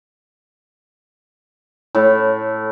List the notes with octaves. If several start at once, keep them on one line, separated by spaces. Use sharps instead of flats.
A2